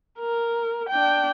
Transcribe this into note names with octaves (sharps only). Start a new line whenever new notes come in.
A#4
D4 G5